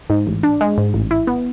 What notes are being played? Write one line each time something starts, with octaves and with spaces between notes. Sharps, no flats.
G#2
A1
D4
G#3
G#2
A1
E4
B3